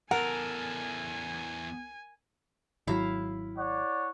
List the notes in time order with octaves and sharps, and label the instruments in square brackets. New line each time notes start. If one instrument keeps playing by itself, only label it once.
[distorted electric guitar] E2 A4 [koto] A#4 [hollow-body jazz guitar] F#5 [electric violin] G#5
[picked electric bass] G#1 F#3 [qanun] E4 E5 F5
[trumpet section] C#5 D5 F#5